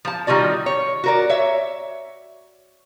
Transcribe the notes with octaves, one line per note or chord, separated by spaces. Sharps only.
F3 A5
D#3 G3 F4 F#4 D5
C#5
F#4 A#4 D5
C#5 E5